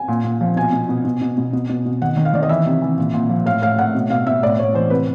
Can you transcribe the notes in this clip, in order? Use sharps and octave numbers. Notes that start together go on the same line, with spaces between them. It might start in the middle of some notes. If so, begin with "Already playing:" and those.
Already playing: G#5
A#2
A#2
F3
B2 G#5
B2
B2
B2
B2
B2
B2
B2
B2
D#3 F#5
D#3
F5
D#3 D5
D#5
E3 E5
C3
E3
A#2
A#2
F3
A2 F5
A2 F5
A2 F#5
B2
B2 F5
B2 E5
A2 D5
A2 C#5
E3 C5
C3 B4